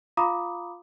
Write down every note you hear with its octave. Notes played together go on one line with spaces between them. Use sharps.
F4 F5 A#5 B5 D6 D#6